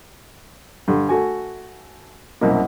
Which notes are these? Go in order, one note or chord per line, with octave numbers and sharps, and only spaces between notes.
G2 D3
A3 F#4 G#5
C2 F#2 B2 A#3